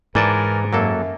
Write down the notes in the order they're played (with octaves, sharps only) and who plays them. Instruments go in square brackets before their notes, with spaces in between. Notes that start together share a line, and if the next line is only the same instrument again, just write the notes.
[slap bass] G#2 [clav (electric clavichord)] E3 D5 A5 [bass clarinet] A#4
[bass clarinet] F#2 [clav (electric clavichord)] F#3 A#3 A4